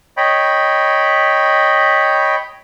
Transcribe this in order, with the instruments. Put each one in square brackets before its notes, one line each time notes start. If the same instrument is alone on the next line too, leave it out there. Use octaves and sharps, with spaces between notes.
[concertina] C#5 D#5 G5 B5